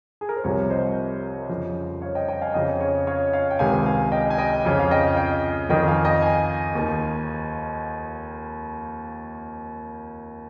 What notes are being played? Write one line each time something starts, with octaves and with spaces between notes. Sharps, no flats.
G#4
A#4
C5
C2 C3 F3 A#4 C#5
C5 D#5
F2 C#3 F3
C#5 F5
D#5 G5
D#5 G5
F5 G#5
F2 C#3 F3 D#5 G5
C#5 F5
C#5 F5
C#5 F5
G5
C#2 C3 D#3 F5 G#5
F5 G#5
D#5 G5
G#5
D#5 G5
F2 C#3 F3
F5
D#5 G5
D#5 G5
F2 D#3 D#5 G5
F5 G#5
D#5 G5
F5 G#5
D#2 D#3